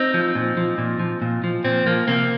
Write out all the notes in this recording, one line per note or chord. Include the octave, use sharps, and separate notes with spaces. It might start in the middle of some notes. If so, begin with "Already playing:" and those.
Already playing: C4 D#4
F3
A#2
F3
A#2
F3
A#2
F3
A#2 C4
F3 A#3
C3 A#3